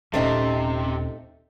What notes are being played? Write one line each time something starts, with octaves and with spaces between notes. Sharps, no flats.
D#1 C3 A3 C4 C#4 D#4